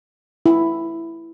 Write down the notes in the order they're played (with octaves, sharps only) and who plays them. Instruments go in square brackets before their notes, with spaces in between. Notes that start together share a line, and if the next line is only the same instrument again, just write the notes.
[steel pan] E4